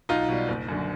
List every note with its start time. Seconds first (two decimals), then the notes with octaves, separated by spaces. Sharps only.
0.09 B1 D#4 F4
0.28 B2 G3
0.48 F#1
0.68 F#2 D3